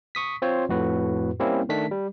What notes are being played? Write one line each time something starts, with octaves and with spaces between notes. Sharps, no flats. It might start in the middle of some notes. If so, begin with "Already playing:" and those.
C#6 D#6 B6
C4 F4 C5 C#5
F2 A2 F#4 B4
G3 A#3 C4 C#4 E4
D#3 A3 D4 B6
G3